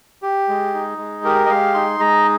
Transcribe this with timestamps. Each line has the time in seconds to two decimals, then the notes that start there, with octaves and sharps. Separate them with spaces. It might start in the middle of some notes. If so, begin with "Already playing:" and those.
0.22 G4
0.49 G#3
0.74 D#4
0.98 G#3
1.24 G4 A#4
1.46 D#5
1.50 G#3 F5
1.74 D#4 C6
2.00 G#3 A#5